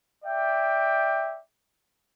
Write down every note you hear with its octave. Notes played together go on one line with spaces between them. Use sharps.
D5 E5 G5